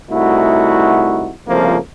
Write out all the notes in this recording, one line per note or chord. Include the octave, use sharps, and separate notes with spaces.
C2 A3 D#4 E4 F#4
C2 F2 C#3 F3 A3 A#3